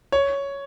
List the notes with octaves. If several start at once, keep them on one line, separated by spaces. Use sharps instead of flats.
C#5